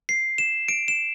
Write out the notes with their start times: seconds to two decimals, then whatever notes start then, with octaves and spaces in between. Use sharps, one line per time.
0.09 C7
0.38 E7
0.68 D7
0.88 E7